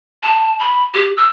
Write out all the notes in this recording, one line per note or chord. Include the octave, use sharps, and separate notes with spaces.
A5
B5
G4
E6